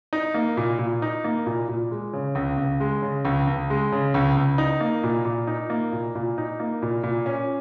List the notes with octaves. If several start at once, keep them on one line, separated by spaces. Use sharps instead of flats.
D#4
A#3
A#2
A#2
D#4
A#3
A#2
A#2
G#3
C#3
C#2
C#2
G#3
C#3
C#2
C#2
G#3
C#3
C#2
C#2
D#4
A#3
A#2
A#2
D#4
A#3
A#2
A#2
D#4
A#3
A#2
A#2
C#4